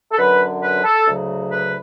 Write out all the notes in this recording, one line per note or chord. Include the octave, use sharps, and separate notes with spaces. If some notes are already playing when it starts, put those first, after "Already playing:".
A4
F#2 D3 F#3 B4
B4
A4
D2 C#3 F#3
B4